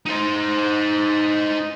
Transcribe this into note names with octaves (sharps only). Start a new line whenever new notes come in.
D#4 C5